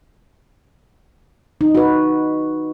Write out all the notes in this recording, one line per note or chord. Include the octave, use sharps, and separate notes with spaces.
D#4
F#4 B4